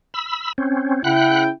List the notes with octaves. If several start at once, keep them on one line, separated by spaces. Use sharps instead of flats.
B5 E6
C4 C#4
C#3 E4 F#5 G5 B5 F#6